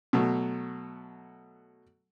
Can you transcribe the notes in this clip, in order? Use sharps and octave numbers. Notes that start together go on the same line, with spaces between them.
B2 F#3 A3